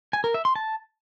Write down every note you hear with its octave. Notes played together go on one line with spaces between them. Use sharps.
G#5
A#4
E5
C6
A5